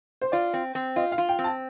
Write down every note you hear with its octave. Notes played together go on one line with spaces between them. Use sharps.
C5
F4 D5
C4
C4
F4 D#5
F5
F4
G5
C4
A5